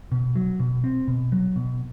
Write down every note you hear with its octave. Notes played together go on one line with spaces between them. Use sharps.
B2
F#3
B2
C4
B2
F#3
B2